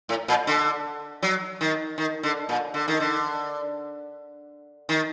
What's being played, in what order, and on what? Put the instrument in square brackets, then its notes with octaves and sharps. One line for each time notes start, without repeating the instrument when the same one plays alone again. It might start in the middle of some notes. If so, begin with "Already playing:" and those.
[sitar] A2
A#2
D3
F#3
D#3
D#3
D3
A#2
D3
D#3
D3
D#3